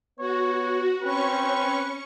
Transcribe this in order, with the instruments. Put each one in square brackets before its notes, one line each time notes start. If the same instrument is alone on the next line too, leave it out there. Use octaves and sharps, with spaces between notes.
[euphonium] B3 [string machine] F#4 [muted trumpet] C#5
[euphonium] C4 [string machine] C#4 C#6 [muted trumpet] B4